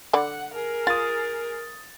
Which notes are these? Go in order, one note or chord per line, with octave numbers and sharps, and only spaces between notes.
D3 D5 F#5 B5
G#4 A#4
F4 D#6 A6